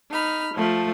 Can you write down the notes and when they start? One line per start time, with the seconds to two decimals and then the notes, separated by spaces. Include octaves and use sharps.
0.11 D#4 B5 F6
0.54 F3 A3